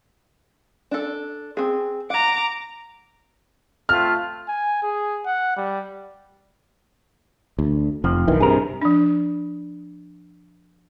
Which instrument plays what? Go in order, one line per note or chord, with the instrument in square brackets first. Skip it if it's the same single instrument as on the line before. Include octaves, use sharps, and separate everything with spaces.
[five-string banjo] D4 A4
C4 G#4
[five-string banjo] F#5 [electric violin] A#5 D6
[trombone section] A3 C4 F4 [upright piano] F6
[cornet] G#5
G#4
F#5
G3
[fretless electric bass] D2
[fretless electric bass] F1 [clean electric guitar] F2 F3
[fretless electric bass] B1 D#3 E3
[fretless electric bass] G2 C3 [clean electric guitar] G#4 A#4
[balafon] F3 D4